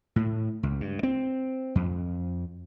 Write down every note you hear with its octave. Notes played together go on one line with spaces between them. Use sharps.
A2
C#2
G2
C4
F2